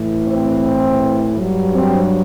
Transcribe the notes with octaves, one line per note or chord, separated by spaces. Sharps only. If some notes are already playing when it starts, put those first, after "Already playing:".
Already playing: A2 E3
C4
G2 F#3
C4